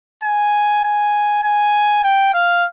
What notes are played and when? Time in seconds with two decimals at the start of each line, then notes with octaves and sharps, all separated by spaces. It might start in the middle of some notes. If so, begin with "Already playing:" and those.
0.23 G#5
0.84 G#5
1.44 G#5
2.04 G5
2.34 F5